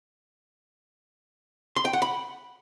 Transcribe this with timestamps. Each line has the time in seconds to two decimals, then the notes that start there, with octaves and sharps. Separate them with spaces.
1.76 C6
1.85 G5
1.93 F#5
2.02 B5